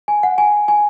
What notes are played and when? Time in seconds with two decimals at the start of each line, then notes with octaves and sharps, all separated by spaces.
0.08 G#5
0.23 F#5
0.38 G#5
0.68 G#5